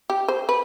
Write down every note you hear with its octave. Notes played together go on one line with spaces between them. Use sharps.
G4
C5
B4